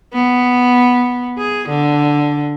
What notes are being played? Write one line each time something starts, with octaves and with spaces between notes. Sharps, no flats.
B3
G#4
D3